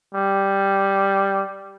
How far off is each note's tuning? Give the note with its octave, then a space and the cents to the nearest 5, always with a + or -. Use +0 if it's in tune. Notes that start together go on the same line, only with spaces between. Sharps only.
G3 +0